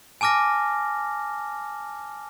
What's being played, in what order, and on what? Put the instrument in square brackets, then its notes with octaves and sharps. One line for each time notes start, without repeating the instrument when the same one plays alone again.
[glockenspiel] G#5 A5 D6 F6 A#6